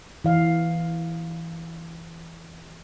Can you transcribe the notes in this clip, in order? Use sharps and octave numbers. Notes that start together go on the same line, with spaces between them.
E3 F5